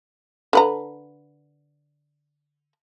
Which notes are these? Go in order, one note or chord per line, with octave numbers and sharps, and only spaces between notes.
D3 B4 A#5